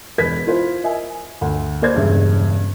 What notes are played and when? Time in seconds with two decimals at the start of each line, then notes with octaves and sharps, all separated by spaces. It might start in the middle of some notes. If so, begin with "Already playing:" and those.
0.18 E1 B4 G#6 B6
0.46 E4 F4 B4 C5
0.83 A#4 D#5 E5 G#5
1.41 D2
1.82 A#3 B4 C5 D5 G#6
1.94 E1 G2 C#3 E5